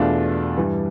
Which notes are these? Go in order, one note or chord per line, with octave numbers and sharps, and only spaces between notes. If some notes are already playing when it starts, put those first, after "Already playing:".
Already playing: E2 B2 A3 D4 F4
G2 E3 G3